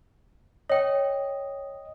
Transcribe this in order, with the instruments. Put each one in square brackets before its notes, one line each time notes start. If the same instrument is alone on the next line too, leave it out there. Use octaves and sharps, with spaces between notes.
[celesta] C#5 G5 [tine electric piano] D#5